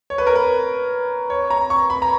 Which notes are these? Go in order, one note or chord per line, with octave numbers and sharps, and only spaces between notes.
C#5
B4
A#4
B4
C#5
A#5
C#6
B5
A#5